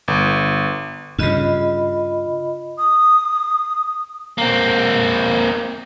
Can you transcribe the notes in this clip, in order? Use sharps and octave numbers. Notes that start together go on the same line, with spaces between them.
G1
G2 C#3 F4 D#5 B5
D#6
A#3 C4